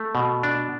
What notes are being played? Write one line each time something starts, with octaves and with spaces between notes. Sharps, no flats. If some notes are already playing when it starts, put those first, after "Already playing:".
Already playing: A3
B2
D4